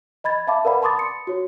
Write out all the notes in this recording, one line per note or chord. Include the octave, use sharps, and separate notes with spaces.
D#5 B5 G#6 A6
E5 F5 A5 B5 D6
A#4 B4 D5 F#5 B5
A5 B5 C6 D6 D#6 A6
C#7
F#4 C#5